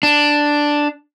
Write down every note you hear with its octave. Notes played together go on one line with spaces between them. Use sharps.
D4